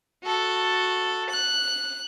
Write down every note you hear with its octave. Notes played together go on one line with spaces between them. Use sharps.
F#4 A4
F#6